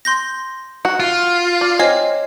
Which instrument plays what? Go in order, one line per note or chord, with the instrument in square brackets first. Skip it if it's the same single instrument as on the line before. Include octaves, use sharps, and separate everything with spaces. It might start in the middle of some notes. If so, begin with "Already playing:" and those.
[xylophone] C6 G6 A#6
[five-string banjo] F#4
[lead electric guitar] F4
[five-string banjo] D5
[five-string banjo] C4 G#5 [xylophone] C#5 D#5 C7